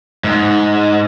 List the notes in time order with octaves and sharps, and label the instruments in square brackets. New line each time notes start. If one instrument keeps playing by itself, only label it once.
[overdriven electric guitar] G#2